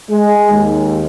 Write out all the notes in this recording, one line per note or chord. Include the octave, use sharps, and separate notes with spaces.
G#3
D#2